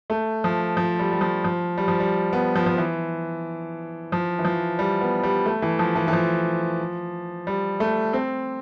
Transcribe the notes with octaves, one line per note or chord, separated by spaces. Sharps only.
A3
F3
F3
G3
G3
F3
F3
G3
F3
G3
B3
F3
F3
E3
F3
E3
F3
G3
B3
G3
A3
E3
F3
E3
E3
F3
G3
A3
C4